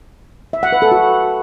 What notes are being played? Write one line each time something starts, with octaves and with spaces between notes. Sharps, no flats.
E5
F#5
B4
A4
F#4